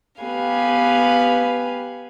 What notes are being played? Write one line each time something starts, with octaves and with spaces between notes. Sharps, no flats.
B3 G4 B4 F5 G#5